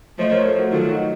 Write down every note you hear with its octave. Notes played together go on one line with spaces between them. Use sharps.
F3 A3 C5 D#5
A#4 C#5
A4 C5
F#4 A#4
D#3 F#3 F4 A4
D#4 F#4